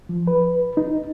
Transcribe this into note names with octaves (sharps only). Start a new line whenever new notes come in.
F3
B4
D#4